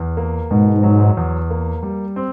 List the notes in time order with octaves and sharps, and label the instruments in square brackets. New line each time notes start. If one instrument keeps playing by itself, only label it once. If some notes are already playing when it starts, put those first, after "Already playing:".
Already playing: [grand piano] E2
A#3
[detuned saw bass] G#2 [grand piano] B2
[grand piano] F#3
E2
A#3
G3
C4